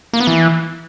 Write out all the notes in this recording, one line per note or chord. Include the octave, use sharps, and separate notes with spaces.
A#3
B3
E3